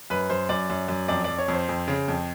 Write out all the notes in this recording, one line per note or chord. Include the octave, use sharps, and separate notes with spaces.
F#2 B4
F#2 C5
F#2 D5
F#2
F#2
F2 D5
F2 D5
C#5
F2
C5
F2
C#3
F2